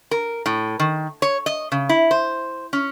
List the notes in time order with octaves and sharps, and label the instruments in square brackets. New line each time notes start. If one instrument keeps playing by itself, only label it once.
[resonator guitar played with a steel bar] A#4
A2
D#3
C#5
D#5
C#3
E4
C5
C#4